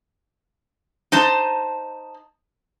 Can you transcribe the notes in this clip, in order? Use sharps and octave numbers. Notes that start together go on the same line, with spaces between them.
D#4 C5 A5